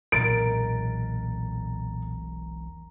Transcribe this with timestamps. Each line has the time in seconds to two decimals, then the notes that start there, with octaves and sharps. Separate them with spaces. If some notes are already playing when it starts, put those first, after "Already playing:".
0.12 E1 B1 A#2 A#4 A6 D7